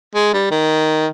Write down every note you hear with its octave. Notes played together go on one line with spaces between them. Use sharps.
G#3
G3
D#3